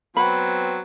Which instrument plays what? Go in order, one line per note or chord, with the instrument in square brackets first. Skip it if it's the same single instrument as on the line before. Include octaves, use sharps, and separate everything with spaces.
[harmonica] F#3 B3 C4 [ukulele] B5